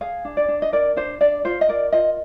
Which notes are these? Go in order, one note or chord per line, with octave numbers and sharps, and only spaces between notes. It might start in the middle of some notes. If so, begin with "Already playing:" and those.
G#4 F5
D4
D5
D4
D#5
A#4 D5
D4 C5
D4 D5
F4 C5
D#5
A#4 D5
F4 D#5